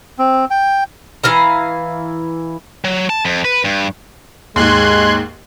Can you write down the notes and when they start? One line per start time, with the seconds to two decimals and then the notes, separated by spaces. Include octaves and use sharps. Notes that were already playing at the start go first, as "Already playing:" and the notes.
0.19 C4
0.51 G5
1.24 E3 F5 A#5
2.85 F#3
3.10 A5
3.25 F2
3.45 B4
3.65 G2
4.56 D#2 G#2 G#3 C6 F#6 G#6